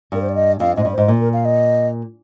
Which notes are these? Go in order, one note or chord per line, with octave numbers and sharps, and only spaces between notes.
G2 A#4
C5
D5
D#5
F2 F5
G#2 D#5
G2
G#2 C5
A#2
A#4
F5
D#5